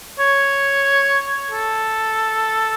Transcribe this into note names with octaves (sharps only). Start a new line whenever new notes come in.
C#5
A4